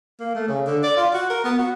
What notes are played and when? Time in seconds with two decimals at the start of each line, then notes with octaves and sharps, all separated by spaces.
0.20 A#3
0.35 A3
0.48 C#3
0.67 D3
0.83 D5
0.97 F4
1.14 F#4
1.30 A#4
1.44 B3
1.59 F#4